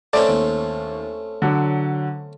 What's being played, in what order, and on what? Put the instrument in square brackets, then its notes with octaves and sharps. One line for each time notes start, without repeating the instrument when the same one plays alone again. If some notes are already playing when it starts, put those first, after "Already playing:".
[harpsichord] A3 C4 C#4 [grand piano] D5
[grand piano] D#2
D3 F#3